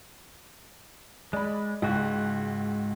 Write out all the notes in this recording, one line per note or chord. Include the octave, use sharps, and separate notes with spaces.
G#3 D5 B5
C#2 G#2 F#4